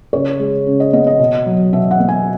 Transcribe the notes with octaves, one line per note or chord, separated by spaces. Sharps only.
C#3 C#5
G#3
C#3
D#5
B3 D#5
D#5
B2
F#3
B2 E5
F#5
B3
G#5